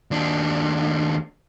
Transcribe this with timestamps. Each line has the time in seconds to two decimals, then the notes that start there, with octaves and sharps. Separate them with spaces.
0.11 D#2 D4